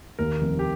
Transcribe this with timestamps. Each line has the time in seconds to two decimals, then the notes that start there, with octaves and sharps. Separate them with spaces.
0.19 D#2 A#4
0.42 F1
0.59 G4